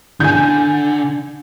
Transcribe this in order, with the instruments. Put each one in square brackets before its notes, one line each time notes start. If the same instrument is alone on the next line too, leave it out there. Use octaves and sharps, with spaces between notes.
[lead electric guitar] D3 [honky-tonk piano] G#5 G6